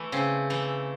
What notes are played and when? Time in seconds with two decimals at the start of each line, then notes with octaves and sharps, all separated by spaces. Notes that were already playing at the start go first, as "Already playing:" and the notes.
Already playing: E3 A3
0.12 C#3 C4
0.50 E3 A3